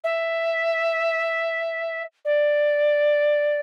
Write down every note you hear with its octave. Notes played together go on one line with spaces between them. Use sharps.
E5
D5